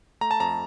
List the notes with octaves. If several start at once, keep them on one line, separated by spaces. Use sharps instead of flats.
A3 A#5
A5
F2 A#5